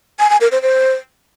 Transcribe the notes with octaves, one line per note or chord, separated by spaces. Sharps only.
G#5
G#5
A#4
C5
C5